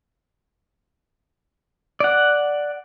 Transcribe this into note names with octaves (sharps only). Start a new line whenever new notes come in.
D5 F#5